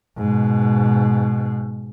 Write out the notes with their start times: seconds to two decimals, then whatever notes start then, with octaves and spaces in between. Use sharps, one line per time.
0.18 G#2 B2